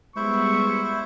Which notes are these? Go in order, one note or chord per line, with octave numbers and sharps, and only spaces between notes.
G3 G#3 B3 E4 C5 E5 C#6